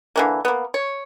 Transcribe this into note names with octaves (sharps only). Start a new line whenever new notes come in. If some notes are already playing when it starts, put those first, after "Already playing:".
D3 E3 A#3
A#3 B3
C#5